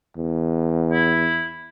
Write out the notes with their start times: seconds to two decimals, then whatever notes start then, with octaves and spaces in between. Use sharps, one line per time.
0.16 E2
0.92 E4